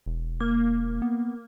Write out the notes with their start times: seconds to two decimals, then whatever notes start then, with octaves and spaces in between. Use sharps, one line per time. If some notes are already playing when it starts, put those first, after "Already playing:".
0.06 E1
0.40 A#3
1.02 B3